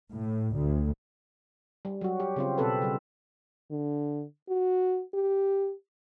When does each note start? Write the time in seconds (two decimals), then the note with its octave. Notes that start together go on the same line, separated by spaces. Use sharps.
0.12 A2
0.55 D2
1.85 G3
2.01 F#3 F#4
2.20 G4
2.36 C#3 C4 F4
2.58 B2 C4 A4 B4
2.82 C#3 G3
3.71 D3
4.49 F#4
5.14 G4